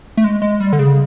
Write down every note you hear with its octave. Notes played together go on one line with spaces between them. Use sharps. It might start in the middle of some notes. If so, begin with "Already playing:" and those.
A3
G#3
G#3
G3
D3
C#3